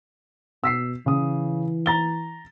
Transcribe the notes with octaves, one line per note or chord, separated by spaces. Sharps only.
B2 E6 B6 C7
C#3 E3 D#6
A#5 A6 G7